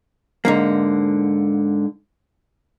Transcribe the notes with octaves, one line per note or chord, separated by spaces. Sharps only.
G#2 D3 A#3